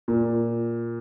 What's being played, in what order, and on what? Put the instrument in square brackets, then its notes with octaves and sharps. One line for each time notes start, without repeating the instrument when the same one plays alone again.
[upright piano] A#2